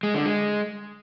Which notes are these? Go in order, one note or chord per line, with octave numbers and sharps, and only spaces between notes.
G#3
D3
G#3